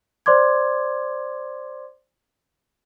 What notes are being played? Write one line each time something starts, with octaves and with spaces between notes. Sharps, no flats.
C5 D5 C6 D6 G#6